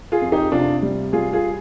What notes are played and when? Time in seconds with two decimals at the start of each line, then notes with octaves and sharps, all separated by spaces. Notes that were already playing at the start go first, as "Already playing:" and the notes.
0.12 F4 G#4
0.22 F2
0.32 D#4 G4
0.52 C3 D4 F4
0.83 G3
1.13 G3 F4 G#4
1.33 F4 G#4